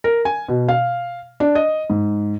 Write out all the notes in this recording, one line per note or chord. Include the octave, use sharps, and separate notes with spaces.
A#4
G#5
B2
F5
D4
D#5
G#2